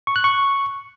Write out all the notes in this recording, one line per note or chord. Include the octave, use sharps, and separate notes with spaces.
C#6
F#6
C#6